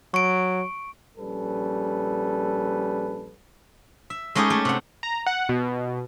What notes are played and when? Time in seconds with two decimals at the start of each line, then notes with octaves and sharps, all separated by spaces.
0.14 F#3 C#6 D7
1.18 A#1 G3 C#4 A4 B4
4.10 E5
4.35 G#3 A3 C#4 D#4 G4 G#4
4.50 A3
4.65 C3 F#5
5.03 A#5
5.27 F#5
5.49 B2